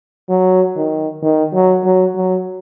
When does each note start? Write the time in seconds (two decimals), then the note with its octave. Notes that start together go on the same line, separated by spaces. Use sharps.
0.29 F#3
0.76 D#3
1.22 D#3
1.54 F#3
1.84 F#3
2.16 F#3